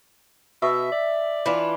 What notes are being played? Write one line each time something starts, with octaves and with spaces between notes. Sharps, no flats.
B2 E5
D5
E3 D4 F4